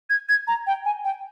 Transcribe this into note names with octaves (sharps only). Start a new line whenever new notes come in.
G#6
G#6
A#5
G5
G#5
G5